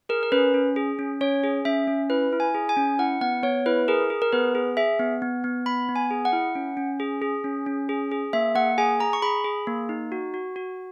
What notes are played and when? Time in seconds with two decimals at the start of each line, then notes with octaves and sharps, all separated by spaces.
0.09 G#4 A#4
0.23 A#4
0.32 C#4 B4
0.54 C#4
0.76 G#4
0.99 C#4
1.21 C#4 C#5
1.43 G#4
1.65 C#4 E5
1.87 C#4
2.10 E4 B4
2.32 E4
2.40 G#5
2.54 G#4
2.69 G#5
2.77 C#4
2.99 E4 F#5
3.21 B3 F#5
3.43 B3 C#5
3.66 E4 B4
3.88 G#4 A#4
4.10 G#4
4.22 A#4
4.32 B3 B4
4.55 G#4
4.77 G#4 E5
4.99 B3
5.22 B3
5.44 B3
5.66 B3 B5
5.89 B3
5.96 G#5
6.11 G#4
6.25 F#5
6.33 E4
6.55 C#4
6.77 C#4
7.00 G#4
7.22 G#4
7.44 C#4
7.66 C#4
7.89 G#4
8.11 G#4
8.33 A#3 E5
8.55 A#3 F#5
8.78 G#4 G#5
9.00 G#4 A#5
9.13 C#6
9.22 G#4 B5
9.44 G#4
9.67 A#3
9.89 D#4
10.12 F#4
10.34 F#4
10.56 F#4